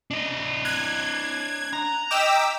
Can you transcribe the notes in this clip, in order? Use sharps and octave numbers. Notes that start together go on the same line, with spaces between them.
D4 D#5
F#6 G#6
A#5
D#5 G5 D6 E6 B6 E7